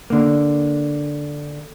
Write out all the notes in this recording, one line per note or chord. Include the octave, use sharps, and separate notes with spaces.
D3 A#3